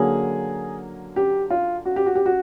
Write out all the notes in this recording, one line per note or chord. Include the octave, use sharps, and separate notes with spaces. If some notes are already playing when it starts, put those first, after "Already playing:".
Already playing: D3 F#3 A#3 C#4 G#4
G4
F4
F#4
G4
F#4
G4
F#4